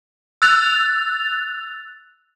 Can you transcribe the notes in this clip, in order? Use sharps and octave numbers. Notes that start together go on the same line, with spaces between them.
E6 F#6 A6 F7